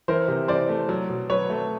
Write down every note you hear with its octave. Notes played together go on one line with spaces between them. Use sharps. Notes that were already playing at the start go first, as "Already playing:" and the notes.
E3 A#4 C5
C3
E3 C5 D5
A3
F#3
B2
F#3 B4 C#5
A3